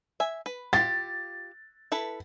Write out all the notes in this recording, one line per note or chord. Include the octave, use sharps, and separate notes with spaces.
E5 G#5
B4
F4 G4 A6
E4 A4 B4